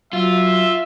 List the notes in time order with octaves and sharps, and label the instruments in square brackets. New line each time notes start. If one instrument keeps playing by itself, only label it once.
[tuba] F#3 [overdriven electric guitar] F4 [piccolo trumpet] E5